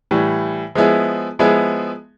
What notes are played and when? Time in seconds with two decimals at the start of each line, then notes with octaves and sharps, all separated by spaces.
0.11 A2 E3 G3
0.75 F3 G#3 B3 E4 G#4
1.39 F3 G#3 B3 E4 G#4